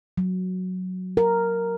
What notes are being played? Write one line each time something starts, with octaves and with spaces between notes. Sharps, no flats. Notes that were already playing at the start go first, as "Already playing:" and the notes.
F#3
A#4